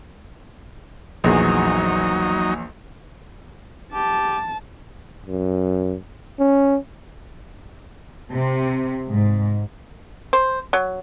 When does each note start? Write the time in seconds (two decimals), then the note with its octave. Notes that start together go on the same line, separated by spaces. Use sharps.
1.24 A#1 E2 F#3 D#4 G#4
3.93 G4 A5
5.26 F#2
6.40 C#4
8.33 C3
9.10 G#2
10.33 C5
10.73 F#3